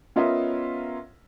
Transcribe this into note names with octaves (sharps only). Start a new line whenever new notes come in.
B3 C#4 F4 A#4 D#5 E5